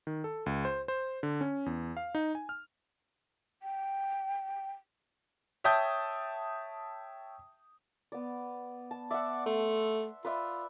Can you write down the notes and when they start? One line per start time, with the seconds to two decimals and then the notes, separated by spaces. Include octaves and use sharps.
0.07 D#3
0.24 A4
0.46 C#2
0.65 C5
0.88 C5
1.23 D3
1.41 C#4
1.66 E2
1.97 F5
2.15 D#4
2.35 G#5
2.49 F6
3.63 G5
5.64 C#5 E5 G5 A5 D#6 G6
8.12 B3 D5
8.91 A5
9.11 D5 E5 F#5
9.46 A3 C6
10.25 F4 B4 D5 E5